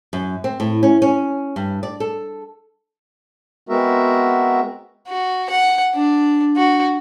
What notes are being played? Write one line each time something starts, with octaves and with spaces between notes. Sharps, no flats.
F#2
C4
A2
C#4
C#4
G2
D5
A4
G#3 B3 C4 F#4 A#4 E5
F#4
F#5
D4
F#4